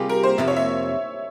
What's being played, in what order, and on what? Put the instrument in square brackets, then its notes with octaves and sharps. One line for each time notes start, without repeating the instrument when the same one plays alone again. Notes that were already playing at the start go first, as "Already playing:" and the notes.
Already playing: [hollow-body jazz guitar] C3 G3 A#3 F4 G#4 [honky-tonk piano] G4
[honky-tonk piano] A#4
C5
[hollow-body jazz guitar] F2 C3 F3 A#3 [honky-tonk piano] E5
[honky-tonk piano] C#5
E5